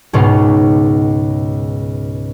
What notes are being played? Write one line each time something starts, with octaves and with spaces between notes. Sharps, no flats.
C#2 G#2 B2 B3 D#4 C6